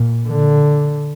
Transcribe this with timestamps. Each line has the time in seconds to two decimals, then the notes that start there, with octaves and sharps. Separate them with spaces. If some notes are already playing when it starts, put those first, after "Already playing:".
Already playing: A#2
0.28 D3